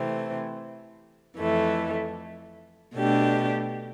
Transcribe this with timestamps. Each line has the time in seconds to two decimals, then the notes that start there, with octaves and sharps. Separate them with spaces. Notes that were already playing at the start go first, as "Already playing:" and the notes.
Already playing: C3 E3 A3 C4
1.38 F2 E3 A3
2.95 B2 A3 D4 G4